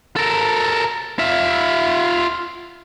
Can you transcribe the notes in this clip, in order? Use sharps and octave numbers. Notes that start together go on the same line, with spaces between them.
A4 A#4
F4 E5